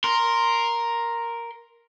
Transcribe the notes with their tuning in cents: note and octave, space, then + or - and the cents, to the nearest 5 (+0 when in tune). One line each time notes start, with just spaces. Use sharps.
A#4 +0 C6 +0